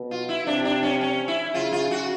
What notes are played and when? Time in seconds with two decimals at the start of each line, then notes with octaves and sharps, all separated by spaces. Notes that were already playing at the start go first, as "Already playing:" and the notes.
Already playing: B2
0.11 F4
0.29 E4
0.47 C3 D4
0.65 D4
0.83 C#4
1.01 C#4
1.28 E4
1.54 C#3 F4
1.73 F4
1.91 F#4